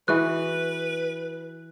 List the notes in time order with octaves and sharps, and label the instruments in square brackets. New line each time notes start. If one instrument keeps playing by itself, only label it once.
[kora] E3 F#4 G#4 [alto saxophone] B4 [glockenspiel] F#6